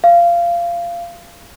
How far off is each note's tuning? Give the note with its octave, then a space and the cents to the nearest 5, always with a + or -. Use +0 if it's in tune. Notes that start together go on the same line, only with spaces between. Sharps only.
F5 -20